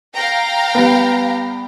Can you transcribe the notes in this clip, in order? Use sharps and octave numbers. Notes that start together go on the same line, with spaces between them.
F5 G5 A#5
G3 B3